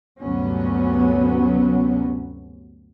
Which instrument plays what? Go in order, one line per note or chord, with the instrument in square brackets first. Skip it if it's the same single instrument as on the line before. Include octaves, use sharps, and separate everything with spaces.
[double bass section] D2 G2 C3 F#3 B3 C#4